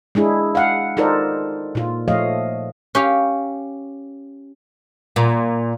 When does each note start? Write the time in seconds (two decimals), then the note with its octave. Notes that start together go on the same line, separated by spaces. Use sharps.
0.15 G#3 D4 E4 G#4
0.55 F5 F#5
0.97 D#4 F4 A4 A#4 C5 D5
1.75 A#2 F4
2.08 A#2 F3 A3 C#5 D#5 F5
2.95 C#4 G4 F5
5.16 A#2